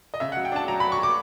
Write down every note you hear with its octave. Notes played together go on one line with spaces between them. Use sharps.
D#5
C#3 E5
F#5
F#3
G5
D4 A5
F#3 A#5
F#3 B5
C#6
F#3 D6